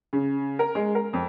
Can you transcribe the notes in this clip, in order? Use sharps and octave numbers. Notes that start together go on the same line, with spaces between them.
C#3
A#4
G#3
A#4
F2